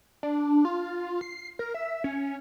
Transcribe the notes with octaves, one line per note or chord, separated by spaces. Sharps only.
D4
F4
C7
A#4
E5
C#4